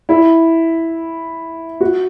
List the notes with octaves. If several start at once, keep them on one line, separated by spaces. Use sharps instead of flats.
E4
F#4